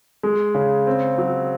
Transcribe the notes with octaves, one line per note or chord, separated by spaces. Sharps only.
G#3
C#3
C4
F#3